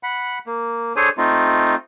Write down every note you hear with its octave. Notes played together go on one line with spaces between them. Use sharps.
F#5 B5
A#3
D4 G#4 A4 C5 C#5 G#5
A3 C4 D#4 F4